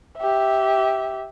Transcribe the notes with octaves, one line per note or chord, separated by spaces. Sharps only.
G4 E5